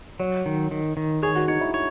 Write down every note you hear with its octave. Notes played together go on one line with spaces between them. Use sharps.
F#3 C#5
D#3
D#3
D#3
G#4 C#5
F#4
D#4 C#5
E4
C#5